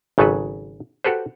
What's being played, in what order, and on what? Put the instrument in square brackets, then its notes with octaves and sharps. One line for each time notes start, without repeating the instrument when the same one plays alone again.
[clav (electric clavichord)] G#1 C#3 F#3 A4 B4
F#4 G4 A4 B4 C5